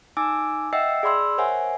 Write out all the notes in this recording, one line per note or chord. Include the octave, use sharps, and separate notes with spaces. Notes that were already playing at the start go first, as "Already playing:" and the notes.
D#4 G#5 D6 E6 D7
D#5 E5 F#5 G5 E6 C7
G#4 D5 B5 C6 E6
A#4 C5 C#5 E5 F#5 G#5